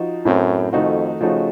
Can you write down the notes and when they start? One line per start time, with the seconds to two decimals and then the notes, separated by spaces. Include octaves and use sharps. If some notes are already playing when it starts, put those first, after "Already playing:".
Already playing: F3 D#4 F#4
0.25 F#2 A2 A3 C4
0.73 F2 D#3 A3 D#4 F#4
1.21 C#3 F3 A3 D#4 F#4